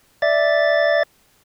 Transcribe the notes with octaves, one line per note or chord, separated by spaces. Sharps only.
D5 E5 A6